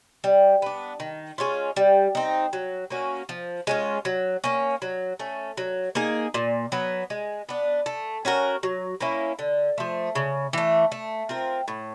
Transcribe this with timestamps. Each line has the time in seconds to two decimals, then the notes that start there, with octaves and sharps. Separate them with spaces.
0.24 G3
0.62 B3 D4
1.00 D#3
1.38 G#3 C#4 F4
1.76 G3
2.15 C4 D#4
2.53 F#3
2.90 A#3 C#4 F#4
3.29 F3
3.67 G#3 C#4 F4
4.05 F#3
4.44 A#3 C#4
4.82 F#3
5.19 A3 C#4
5.57 F#3
5.95 A#3 D#4 G#4
6.34 A#2
6.72 F#3 B3
7.10 G#3
7.49 B3 D4
7.86 A3
8.25 C#4 F#4 A#4
8.63 F#3
9.01 A#3 C#4 E4
9.39 D3
9.78 F3 A3
10.15 C#3
10.53 E3 A3
10.92 A3
11.29 C4 F4 A#4
11.68 A2